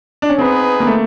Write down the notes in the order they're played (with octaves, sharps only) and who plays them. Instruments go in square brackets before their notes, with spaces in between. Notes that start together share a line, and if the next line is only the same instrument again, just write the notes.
[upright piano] D4
C#4
[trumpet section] B3 D#4 G#4 B4 [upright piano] C4
[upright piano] A#3
A3